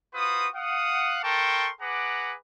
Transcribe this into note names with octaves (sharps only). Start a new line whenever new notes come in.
F4 F#4 B4 C5 D#6
F5 F#5 D#6
A4 A#4 G5 A5 C6 C#6
G#4 B4 F#5 A#5 D6